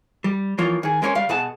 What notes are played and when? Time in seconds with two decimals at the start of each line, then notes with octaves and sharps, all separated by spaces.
0.24 G3
0.58 E3 F3 A#3 F4 C#5
0.83 D#3 G#4
1.02 G#3 A#3 C#4 A#4 C#5
1.15 C#2 G3 F5
1.29 B2 G#4 F#5 A5